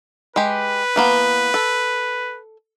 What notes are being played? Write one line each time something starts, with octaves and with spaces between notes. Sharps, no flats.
G#3 G4 B4
E3 A#3 B3
A4